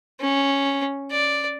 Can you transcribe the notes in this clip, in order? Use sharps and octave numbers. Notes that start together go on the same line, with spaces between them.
C#4
D5